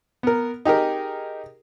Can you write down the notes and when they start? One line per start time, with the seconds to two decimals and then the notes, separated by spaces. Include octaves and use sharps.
0.23 B3 A#4
0.65 D#4 G4 G#4 A#4